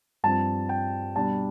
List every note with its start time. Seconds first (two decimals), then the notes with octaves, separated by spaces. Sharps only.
0.24 G2 F3 C4 A5
0.69 G5
1.16 B2 G3 D4 A5